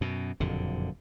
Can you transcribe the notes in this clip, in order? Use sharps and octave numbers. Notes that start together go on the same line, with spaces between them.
F#2 B2
F#1 F2 A#2 D3